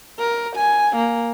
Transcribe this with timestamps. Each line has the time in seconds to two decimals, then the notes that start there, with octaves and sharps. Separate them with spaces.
0.19 A#4
0.56 G#5
0.96 A#3